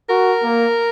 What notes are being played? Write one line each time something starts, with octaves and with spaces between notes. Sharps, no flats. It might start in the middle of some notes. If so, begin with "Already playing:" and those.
F#4 A#4
A#3